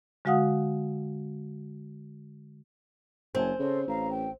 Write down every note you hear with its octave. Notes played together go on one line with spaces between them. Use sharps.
D3 G#3 F#4 F5 F#5 D#6
F#1 C4 G#5 A5
C#3 A4 C5 D#5
A1 F5 A#5
G5